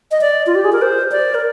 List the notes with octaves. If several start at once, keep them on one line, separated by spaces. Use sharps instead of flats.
D#5
D5
F4
G4
G#4
A#4
C5
D5
A#4